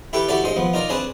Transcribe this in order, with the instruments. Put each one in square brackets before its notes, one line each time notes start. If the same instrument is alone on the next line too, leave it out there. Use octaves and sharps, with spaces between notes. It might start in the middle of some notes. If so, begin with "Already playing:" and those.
[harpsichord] E4 G4 A4 B4 G5
E4 F#4 G4 A4 B4 D5
G2 G#3 C5
F3 B3
D#4 F4 A#4 D5
C4 D4 G#4 B4 G#5 A5